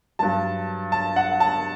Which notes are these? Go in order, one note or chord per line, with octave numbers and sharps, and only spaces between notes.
G2 F#3 A5
A5
F#5
A5